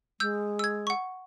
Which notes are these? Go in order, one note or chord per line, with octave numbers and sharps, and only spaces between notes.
G#3 E6 G6
E6 G#6
F#5 C#6